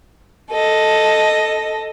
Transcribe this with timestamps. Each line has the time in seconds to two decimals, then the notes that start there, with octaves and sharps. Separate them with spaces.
0.50 A4 D#5